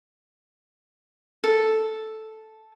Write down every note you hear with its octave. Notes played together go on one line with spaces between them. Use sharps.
A4